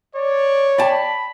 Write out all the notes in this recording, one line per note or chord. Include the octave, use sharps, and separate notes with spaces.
C#5 D5
D5 G5 A5 B5